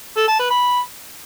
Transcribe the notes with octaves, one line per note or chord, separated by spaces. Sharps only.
A4
A5
B4
B5